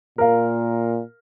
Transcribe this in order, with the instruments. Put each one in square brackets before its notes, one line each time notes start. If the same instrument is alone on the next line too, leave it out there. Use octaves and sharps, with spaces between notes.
[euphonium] A#2 [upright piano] A#4 F5